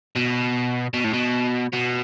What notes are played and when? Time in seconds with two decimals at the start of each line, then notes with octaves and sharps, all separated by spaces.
0.16 B2
0.94 B2
1.04 A2
1.14 B2
1.73 B2